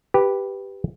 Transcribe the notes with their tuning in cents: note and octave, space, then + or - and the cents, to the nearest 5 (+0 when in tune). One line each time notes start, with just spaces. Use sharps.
G4 +0 B4 +0